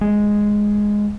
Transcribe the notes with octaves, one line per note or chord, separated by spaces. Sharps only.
G#3